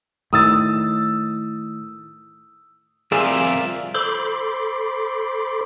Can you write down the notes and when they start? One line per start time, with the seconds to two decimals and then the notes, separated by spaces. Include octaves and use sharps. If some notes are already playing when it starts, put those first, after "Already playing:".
0.33 A2 D#3 D#6 E6 A6
3.12 C2 F2 F4 G#4 A#4 D5 E5
3.95 A4 C5 B5 C6 D6